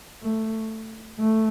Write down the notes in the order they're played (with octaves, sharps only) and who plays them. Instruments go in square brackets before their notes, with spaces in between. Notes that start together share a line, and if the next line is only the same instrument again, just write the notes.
[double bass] A3
A3